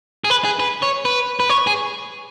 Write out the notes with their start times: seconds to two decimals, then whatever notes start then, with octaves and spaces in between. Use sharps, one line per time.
0.25 G#4
0.30 B4
0.44 G#4
0.59 B4
0.82 C#5
1.05 B4
1.40 B4
1.50 C#5
1.67 G#4